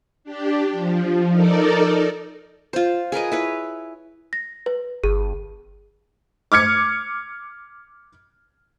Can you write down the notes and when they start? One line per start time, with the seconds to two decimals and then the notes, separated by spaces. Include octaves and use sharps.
0.24 D4 G4
0.71 F3
1.30 D#4 A4 A#4 D5
2.73 F4 C5
3.12 G#4 A#4 B4 D#5
3.32 E4 B4 C#5
4.33 A#6
4.66 B4
5.04 G1 G#4
6.52 D6 F6 G#6 C#7